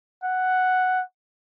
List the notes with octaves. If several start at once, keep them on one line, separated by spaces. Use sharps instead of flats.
F#5